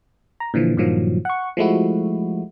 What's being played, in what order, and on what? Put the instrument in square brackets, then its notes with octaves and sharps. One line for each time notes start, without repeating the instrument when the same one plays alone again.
[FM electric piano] A#5
A#2 D3 E3 F3
G2 A#2 D#3 F3 F#3
F#5 C#6
F3 G#3 A3 E4 F#4